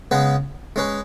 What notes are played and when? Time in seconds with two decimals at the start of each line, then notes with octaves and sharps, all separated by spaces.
0.11 C#3 G#3 B3 G#4 B4
0.76 G#3 C#4 G#4 B4